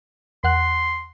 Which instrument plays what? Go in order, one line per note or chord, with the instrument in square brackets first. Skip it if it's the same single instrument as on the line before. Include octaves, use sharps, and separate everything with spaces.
[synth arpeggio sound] E2 F#5 F#6 [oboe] C6